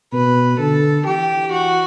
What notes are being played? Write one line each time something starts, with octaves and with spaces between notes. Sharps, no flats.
B2 B4
D3 A4
E3 G4
F#4